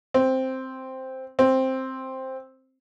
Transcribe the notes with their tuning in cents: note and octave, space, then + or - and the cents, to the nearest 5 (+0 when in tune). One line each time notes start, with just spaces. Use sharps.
C4 +0
C4 +5